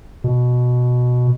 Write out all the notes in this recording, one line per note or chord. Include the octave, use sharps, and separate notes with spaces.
B2